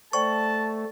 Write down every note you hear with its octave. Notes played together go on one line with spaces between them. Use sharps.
A3 C5 D5 G5 A5 C#6